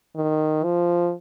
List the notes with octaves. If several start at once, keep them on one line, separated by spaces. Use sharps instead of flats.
D#3
F3